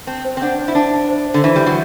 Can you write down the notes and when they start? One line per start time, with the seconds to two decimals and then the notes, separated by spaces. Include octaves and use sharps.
0.07 C4 A5
0.25 C5
0.37 C4
0.41 D4 F#5
0.59 C5
0.68 E4
0.75 D4 A5
0.93 A5
1.09 C5
1.27 C5
1.34 D3
1.43 E3 E5
1.56 G3
1.61 E5
1.66 F#3